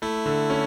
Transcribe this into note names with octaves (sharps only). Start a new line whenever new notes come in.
A3 E4
D3
C#4